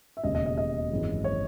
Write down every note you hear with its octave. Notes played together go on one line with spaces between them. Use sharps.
E5
E1 D#2 C#3 D#5
D#5
D#5
D#5
G#1 F#2 E3 G#3
C#5